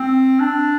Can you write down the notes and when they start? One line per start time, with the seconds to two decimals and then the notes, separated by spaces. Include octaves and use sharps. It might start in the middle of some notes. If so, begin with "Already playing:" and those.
Already playing: C4
0.40 D4